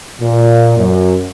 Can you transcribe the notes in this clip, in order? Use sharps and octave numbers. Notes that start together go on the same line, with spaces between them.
A#2
F#2